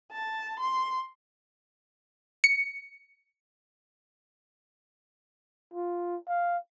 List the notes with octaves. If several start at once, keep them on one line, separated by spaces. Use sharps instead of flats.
A5
C6
C#7
F4
F5